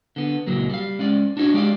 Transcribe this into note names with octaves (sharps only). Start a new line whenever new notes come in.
D3 B3
C#2 A#2 F#3 A#3
G3 F5
G#3 C#4 D5
D4 D#4 F#4 C5 C#5
G#3 G4 D5 F5